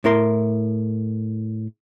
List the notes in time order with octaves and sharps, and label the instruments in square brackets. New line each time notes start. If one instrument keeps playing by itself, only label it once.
[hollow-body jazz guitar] A2 E4 A#4 C6